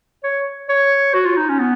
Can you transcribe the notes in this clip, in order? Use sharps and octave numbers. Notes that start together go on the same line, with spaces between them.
C#5
C#5
F#4
F4
D#4
C#4
B3